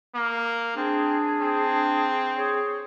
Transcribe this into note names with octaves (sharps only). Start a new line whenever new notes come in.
A#3
C4 D4 G#4
C4
G#4 C#5